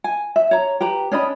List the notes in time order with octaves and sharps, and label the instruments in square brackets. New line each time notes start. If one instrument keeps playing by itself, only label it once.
[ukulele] G#5
E5
C#5 A#5
G4 B4 A#5
C#4 D4 D#5 B5